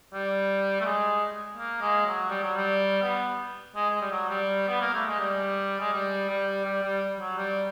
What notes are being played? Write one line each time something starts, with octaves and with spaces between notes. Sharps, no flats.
G3
A3
G#3
A#3
G#3
F#3
G3
F#3
G3
B3
G#3
G#3
G3
F#3
G3
B3
A#3
A3
G#3
G3
G#3
G3
G3
G3
G3
F#3
G3